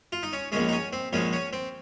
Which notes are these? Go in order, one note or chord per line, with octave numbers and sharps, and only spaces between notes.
F4
D#4
C#4
A#1 A#2 G#3 C#4
D#4
C#4
C4
A#1 A#2 G#3 C#4
C#4
C4